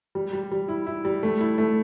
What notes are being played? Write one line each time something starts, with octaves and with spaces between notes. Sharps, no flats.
G3
G3
G3
E4
E4
G3
A3
E4
A3